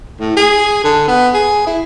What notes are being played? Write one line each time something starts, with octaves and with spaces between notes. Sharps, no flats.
A2
G#4
D3
B3
G#4
E4